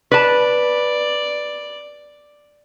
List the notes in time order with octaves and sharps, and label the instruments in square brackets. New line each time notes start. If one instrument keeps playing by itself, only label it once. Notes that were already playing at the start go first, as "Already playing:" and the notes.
[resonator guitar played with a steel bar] B4 A5 [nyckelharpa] D5